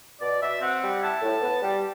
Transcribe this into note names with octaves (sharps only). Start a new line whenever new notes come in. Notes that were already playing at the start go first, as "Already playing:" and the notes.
B2 D5
B2 E5
C4 F#5
G3
E4 A5
A2
B3
G3